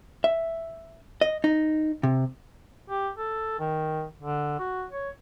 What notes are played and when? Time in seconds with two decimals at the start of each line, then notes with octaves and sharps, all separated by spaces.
0.24 E5
1.21 D#5
1.44 D#4
2.03 C3
2.88 G4
3.18 A4
3.59 D#3
4.19 D3
4.59 F#4
4.91 C#5